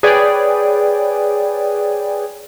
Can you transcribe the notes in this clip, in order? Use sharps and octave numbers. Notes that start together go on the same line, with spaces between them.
G#4 B4 C#5 D5 G5 G#5